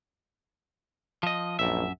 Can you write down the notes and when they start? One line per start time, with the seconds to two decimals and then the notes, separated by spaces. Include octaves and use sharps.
1.23 F3 D#5
1.59 A#1 F#2 E5